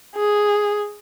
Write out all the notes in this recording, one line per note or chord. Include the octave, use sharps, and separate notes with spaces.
G#4